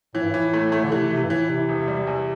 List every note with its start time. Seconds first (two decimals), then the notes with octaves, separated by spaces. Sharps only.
0.15 A2 E3
0.23 G2
0.31 A2 E3
0.53 A3
0.72 A3
0.84 D3
0.91 C3 E3
1.11 C3 E3
1.24 G2
1.30 A2 E3
1.49 C3 E3
1.69 E1
1.88 G3
2.07 E2